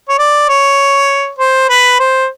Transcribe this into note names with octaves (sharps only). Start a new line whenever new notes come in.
C#5
D5
C#5
C5
B4
C5